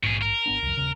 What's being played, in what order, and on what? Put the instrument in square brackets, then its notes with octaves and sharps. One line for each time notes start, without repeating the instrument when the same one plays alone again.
[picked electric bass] A#1 G#2 [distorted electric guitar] B2 G#4
[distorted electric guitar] A#4
[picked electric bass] G#1 B3 D4
C2 F2
D#1 C#3